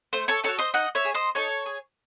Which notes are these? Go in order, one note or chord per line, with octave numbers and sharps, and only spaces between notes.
A3 C5
A4 C#5
D#4 F#4 A4 C#5
C5 D#5
D#4 D#5 F#5
C#5 E5
G#4
C5 D#5
D#4 A4 C#5
G#4